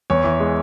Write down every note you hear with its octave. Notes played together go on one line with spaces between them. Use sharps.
E2 C#5
E3
G#3